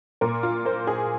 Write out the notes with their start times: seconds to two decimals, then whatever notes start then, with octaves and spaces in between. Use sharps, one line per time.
0.21 A#2 A#4
0.43 F4
0.65 A#3 C5
0.87 G#4